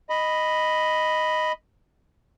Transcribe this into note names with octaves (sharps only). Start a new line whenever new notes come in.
D#5 B5